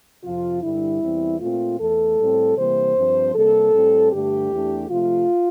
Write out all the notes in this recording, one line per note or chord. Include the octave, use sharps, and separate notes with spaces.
F2 C3 F3 F4
G2 D3 G3 E4
E2 E3 G3 C4
A#2 A3 C4 F4
E2 E3 A3 A4
A2 G3 C4
C3 E3 G3 A#3 C5
G2 F3 C4
C3 G3 A#3 A4
A2 G3 C4
G2 D3 A3 D4 G4
E2 E3 A3 D4
C3 F3 A3 F4